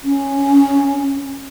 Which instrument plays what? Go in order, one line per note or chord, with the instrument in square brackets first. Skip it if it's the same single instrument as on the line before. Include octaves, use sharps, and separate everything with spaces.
[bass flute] C#4